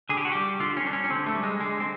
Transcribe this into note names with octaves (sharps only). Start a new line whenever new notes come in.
D3 G#4
G4
F#4
G3 G4
D3 F4
C#4
G3 D4
C#4
C#4
D3 C4
A3
G3
G#3
D3 G#3
C4